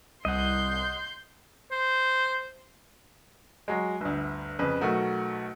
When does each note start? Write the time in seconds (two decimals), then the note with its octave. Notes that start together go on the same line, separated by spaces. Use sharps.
0.25 C2 D#5 F#5 C6 G6
1.71 C5
3.68 F#3 G#3
4.01 G1 D2
4.59 F2 C#3 B4
4.81 B1 A3 F#4 A#4